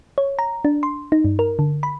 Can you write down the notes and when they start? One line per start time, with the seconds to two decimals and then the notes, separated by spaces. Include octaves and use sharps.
0.18 C#5
0.39 A#5
0.65 D4
0.83 C6
1.12 D#4
1.24 G2
1.39 A#4
1.59 D3
1.83 B5